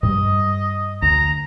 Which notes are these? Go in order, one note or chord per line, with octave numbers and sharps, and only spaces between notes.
G2 G3 D#5
D2 A#5